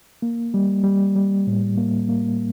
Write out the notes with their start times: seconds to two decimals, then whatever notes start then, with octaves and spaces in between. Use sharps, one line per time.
0.22 A#3
0.54 G3
0.84 G3
1.16 G3
1.47 A2
1.78 A#3
2.09 A#3